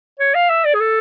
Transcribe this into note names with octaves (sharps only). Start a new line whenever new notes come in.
C#5
F5
E5
D5
G#4
A4